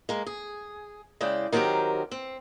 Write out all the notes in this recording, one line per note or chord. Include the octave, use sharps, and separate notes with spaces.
G#3 A#3
G#4
C#3 G#3 E4 D5 G5
D#3 F#3 C4 C#4 G4 A#4
C4